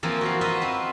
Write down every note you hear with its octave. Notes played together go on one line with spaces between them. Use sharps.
E3 F3 A#3 C4
F#4 A#4 F5
F4 F#4 B4 D#5 E5
C4 B4